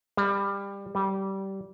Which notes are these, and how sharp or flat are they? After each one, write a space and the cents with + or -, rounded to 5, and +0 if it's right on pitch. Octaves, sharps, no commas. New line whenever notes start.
G3 +20
G3 -20